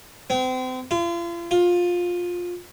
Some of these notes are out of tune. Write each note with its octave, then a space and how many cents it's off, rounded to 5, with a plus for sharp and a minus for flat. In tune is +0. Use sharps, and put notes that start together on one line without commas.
C4 -35
F4 -40
F4 +15